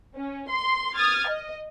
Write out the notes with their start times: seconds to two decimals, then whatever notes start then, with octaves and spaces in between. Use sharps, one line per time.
0.16 C#4
0.50 C6
0.95 D#6 F6 G#6 A6
1.28 D#5